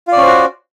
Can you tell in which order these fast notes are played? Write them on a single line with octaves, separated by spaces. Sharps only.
F4 D5 C#4 C5 F#4